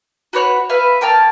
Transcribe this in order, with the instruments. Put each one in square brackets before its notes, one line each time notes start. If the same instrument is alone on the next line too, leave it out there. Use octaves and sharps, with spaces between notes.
[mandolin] F#4 B4 C#5 F#6
B4 E5 F5
A#3 G5 A5 F6